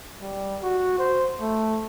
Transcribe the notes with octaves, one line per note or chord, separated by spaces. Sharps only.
G3
F#4
C5
A3